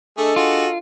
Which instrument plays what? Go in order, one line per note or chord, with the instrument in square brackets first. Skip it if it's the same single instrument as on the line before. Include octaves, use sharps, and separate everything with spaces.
[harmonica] A3 G#4 [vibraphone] D4 D#5 [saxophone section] A4
[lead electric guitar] F4 [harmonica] F#4 G#4